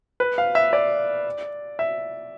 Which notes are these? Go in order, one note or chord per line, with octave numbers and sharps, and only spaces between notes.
B4
F5
E5
D5
E5